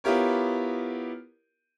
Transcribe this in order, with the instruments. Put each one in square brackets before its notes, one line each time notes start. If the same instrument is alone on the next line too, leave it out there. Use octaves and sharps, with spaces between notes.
[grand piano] B3 E4 F4 G4 A#4 C#5